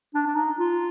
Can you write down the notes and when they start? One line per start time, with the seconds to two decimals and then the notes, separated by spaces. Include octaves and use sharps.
0.14 D4
0.27 D4
0.36 D#4
0.58 F4